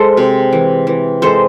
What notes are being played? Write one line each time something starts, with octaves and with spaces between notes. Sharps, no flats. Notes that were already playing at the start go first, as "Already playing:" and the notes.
Already playing: G#3 A4 C5
C3
E3
E3
G#3 A4 C5